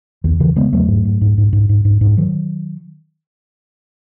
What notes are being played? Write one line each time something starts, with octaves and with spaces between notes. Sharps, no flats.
E2 D#3
C#3 E3
C#3 G#3 B3
E2 F#3 A3
G#2
G#2
G#2
G#2
G#2
G#2
G#2
G#2
D#3 F#3